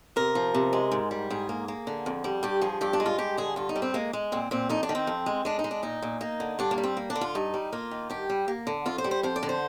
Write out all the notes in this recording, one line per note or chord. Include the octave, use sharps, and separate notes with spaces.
C3 A#4
F3
C3
G#3
G#2
G3
G#2 G#4
A#3
A#3
D3
F2
G3
G2 G4
F3 G#4
G2 G4
D4
G#3
F4
G2 G4
D3 G#4
G2 F4
D#4
G3
C4
G#3 A#3
G#3
A#2 C4
A#2 C4
F2 D#4
D4
D#3
C4
F2
G#3
G#3 D4
D#4
G#3
D4
A#2 D#4
A#2
A#3 D#4
D3
G2 D4
A#3
G3
C4
A#3
D4
D3
F4
G2 D#4
G3
A#3 F4
D#3
G2 G4
G3
A#3
D3
F2 F4
C5
G3
C5
F2 C5
D5
D3
C5